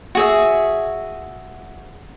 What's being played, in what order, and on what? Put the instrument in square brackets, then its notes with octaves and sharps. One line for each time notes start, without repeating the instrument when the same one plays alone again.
[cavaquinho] F#4 G#4 E5